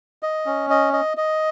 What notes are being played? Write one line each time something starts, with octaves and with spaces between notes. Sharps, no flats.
D#5
C#4
D#5
D#5
D#5